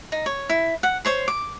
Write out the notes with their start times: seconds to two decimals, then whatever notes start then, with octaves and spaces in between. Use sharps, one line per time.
0.12 D#4
0.26 C#5
0.49 E4
0.83 F#5
1.05 C5 C#5 C6
1.28 D6